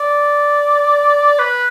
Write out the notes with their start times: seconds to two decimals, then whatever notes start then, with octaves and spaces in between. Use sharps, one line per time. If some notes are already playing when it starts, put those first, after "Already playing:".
Already playing: D5
1.39 B4